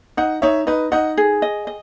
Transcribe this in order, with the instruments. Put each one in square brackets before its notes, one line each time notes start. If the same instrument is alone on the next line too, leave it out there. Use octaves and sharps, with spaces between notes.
[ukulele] D#4 [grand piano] D#5 F#5
[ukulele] D#4 [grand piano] C#5 E5
[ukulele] D#4 [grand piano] B4 D#5
[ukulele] D#4 [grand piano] D#5 F#5
[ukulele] G#4
D#5
D#5